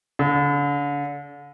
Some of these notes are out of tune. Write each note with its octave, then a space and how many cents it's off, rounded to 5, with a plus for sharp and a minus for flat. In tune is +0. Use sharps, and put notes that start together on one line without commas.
D3 -35